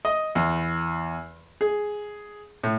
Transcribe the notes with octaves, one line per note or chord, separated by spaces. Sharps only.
D#5
E2
G#4
A2